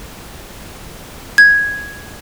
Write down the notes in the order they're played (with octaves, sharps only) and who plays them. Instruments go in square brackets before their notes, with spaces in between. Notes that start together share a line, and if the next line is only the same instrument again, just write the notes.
[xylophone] G#6